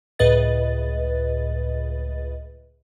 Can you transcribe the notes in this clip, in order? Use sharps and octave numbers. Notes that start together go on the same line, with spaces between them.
C#2 A2 B4 D#5 A6